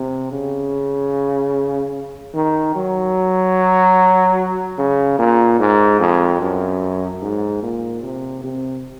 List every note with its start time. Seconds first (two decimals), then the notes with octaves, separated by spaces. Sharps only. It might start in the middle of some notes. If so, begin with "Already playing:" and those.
Already playing: C3
0.32 C#3
2.35 D#3
2.76 F#3
4.79 C#3
5.19 A#2
5.60 G#2
6.00 F2
6.41 F#2
7.22 G#2
7.63 A#2
8.03 C3
8.44 C3